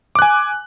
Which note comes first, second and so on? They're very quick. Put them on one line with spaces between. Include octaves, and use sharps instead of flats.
D6 F#6 G#5